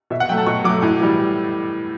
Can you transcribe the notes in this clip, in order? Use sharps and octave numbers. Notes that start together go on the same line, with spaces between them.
B2 E5
F#5
F#3 A3 G5
A5
B2 C#6
F#3 A3 D6
A2
E3 G3